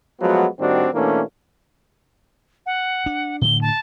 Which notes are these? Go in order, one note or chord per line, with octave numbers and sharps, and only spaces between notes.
F3 F#3 G#3 A3 B3 F#4
A2 D#3 G3 C4 D4 F#4
B2 E3 A3 A#3 C#4 D4
F#5
D4
A2 D3 G7
A5